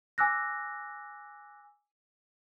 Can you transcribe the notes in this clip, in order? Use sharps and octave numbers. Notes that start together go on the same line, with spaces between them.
G#5 D6 E6 F#6 A#6